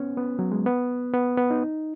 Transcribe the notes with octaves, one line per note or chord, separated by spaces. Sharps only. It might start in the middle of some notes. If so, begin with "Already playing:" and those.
Already playing: B3 C#4
B3
F#3
G#3
B3
B3
B3
D#4